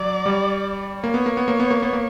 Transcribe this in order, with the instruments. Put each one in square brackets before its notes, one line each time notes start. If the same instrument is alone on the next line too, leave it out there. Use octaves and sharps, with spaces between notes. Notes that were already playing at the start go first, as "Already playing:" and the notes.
Already playing: [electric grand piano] F#3 [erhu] D5
[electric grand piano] G3
[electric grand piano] A#3 [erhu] C#5
[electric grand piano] B3
A#3
B3
A#3
B3
A#3
B3
A#3